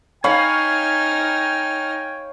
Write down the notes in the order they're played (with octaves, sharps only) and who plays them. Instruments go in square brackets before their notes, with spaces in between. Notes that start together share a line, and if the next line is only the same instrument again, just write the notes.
[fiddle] D#4 F6 [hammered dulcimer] C#5 F5 B5 [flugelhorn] G5 [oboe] G#5